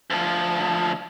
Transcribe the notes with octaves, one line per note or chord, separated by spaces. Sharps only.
D2 F3